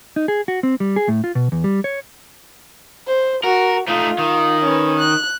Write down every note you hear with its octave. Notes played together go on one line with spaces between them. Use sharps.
D#4
G#4
F#4
C4
G3
G#4
A2
F4
B2
E2
G3
C#5
C5
F#4 A#4
A3 D#4 F4
D#3
C#4 B4
F#6